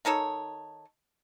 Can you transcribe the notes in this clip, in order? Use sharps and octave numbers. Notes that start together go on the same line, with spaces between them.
D#3 D#4 A4 C#5